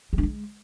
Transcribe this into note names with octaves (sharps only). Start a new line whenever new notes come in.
G#3
D4
G#3